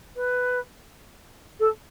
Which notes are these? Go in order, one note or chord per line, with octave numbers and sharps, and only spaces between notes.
B4
A4